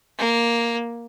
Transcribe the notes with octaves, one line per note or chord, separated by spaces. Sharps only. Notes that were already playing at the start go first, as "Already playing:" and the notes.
A#3